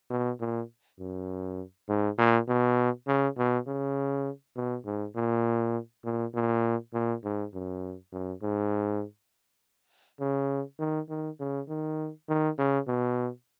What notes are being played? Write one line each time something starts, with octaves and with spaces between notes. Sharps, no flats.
B2
A#2
F#2
G#2
A#2
B2
C#3
B2
C#3
B2
G#2
A#2
A#2
A#2
A#2
G#2
F#2
F#2
G#2
C#3
D#3
D#3
C#3
D#3
D#3
C#3
B2